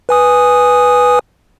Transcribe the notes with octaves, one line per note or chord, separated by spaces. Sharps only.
B4 G#5 D#6